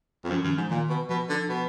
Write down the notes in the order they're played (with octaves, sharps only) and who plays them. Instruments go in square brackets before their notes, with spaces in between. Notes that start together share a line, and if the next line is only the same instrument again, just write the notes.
[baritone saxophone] F2
[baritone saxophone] F#2 [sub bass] F3
[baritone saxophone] F#2 [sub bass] D#3
[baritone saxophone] G#2 [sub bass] F3
[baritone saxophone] A#2 [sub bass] D#3
[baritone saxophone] B2
[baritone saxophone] B2 [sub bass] F3
[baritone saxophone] D3
B2